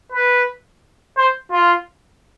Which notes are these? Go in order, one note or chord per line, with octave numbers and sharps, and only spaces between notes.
B4
C5
F4